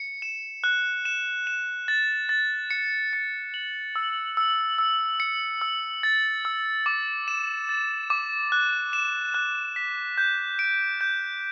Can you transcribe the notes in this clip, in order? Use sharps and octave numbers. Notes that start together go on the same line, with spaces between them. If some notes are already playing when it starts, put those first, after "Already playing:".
Already playing: C#7
E7
F#6
E7
E7
A6
A6
C#7
C#7
F#7
E6
E6
E6
C#7
E6
A6
E6
D6
E7
A6
D6
F#6
E7
F#6
B6
G6
D7
G6